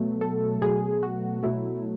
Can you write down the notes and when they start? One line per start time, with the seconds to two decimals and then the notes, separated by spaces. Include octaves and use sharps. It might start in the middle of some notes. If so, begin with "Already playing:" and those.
Already playing: B2 F#3 A3
0.21 A4
0.61 B2 F#3 A3 G#4
1.03 F#4
1.43 B2 F#3 A3 E4